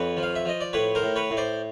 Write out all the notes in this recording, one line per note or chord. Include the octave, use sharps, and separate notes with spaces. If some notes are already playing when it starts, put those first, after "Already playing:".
Already playing: F2 B4 C#5
F3
F5
E5
F3 D#5
D5
A2 B4 C#5
A#4 C5
A2
B4 C#5
A2
C5 D5